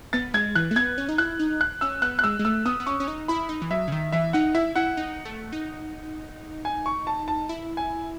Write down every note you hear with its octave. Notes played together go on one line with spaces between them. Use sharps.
B3 A6
G#3 G#6
E3 F#6
A3
B3 G#6
C#4
D#4
E4 F#6
D#4
F#6
C#4 E6
B3 F#6
F#6
G#3 E6
G#3
A3 E6
B3 D#6
B3
C#4 C#6
C#4
D#4
E4 B5
D#4
E3
F#3 E5
C#3
D#3
E3 E5
D#4 F#5
E4 E5
E4 F#5
D#4
A3
D#4
G#5
C#6
A5
A5
E4
G#5